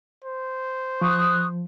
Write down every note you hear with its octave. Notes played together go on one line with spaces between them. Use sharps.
C5
F3 C#6 D#6 F#6